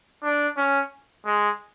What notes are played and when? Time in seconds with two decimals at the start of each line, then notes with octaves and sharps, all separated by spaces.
0.23 D4
0.58 C#4
1.26 G#3